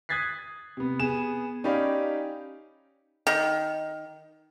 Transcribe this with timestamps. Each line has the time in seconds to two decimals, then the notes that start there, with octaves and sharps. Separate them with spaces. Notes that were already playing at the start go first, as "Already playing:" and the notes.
0.09 D#6 F#6 G#6 A6 B6 C7
0.77 C3 B3
0.99 B3 G#4 E7
1.64 C#4 D#4 G4 D5 F5 B5
3.27 D#3